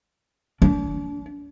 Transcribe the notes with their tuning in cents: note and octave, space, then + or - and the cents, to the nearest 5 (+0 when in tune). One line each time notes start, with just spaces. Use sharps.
D4 -40